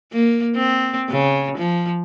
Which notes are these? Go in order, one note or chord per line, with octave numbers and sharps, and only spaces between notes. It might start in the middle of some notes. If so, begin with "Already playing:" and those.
A#3
C4
C#3
F3